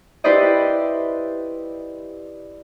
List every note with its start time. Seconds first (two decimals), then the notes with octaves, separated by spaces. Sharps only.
0.24 E4 G4 B4 C5 D5 D#5